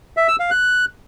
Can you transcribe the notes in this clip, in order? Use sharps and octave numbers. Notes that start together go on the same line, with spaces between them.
E5
E6
F5
F#6